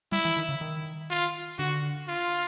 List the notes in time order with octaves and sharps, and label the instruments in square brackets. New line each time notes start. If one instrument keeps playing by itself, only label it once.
[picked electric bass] G3 [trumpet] E4
[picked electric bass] E3
D#3
C#3
D#3
[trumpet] F4
[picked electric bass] D3 [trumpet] F#4
[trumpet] F4